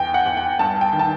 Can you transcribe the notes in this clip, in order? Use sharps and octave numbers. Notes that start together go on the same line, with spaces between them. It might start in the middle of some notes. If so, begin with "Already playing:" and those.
Already playing: E2 G5
F#5
E2
G5
G2 A5
G5
D#3
A5